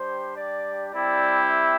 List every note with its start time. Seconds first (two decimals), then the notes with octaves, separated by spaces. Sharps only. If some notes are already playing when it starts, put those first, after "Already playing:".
Already playing: G3 D4 G4 C5
0.36 D5
0.92 G3 C4 E4 G4 D5
1.48 E5